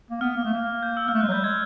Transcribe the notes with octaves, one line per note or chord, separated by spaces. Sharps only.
A#3
B3 F6
A#3
A3
A#3
G6
E6
A#3 F6
A3
G#3 F#6
F#3
G3 G6
G#3 G#6